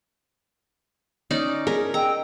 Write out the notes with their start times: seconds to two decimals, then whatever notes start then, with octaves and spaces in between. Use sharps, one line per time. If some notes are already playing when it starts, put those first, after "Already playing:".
1.31 C#4 D#4 D5
1.67 G#4 A#4
1.94 D#5 G5 A#5 E6